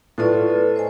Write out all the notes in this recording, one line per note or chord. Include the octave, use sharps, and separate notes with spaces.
A2 F4 A4 B4 D5
C5 D#5 G#5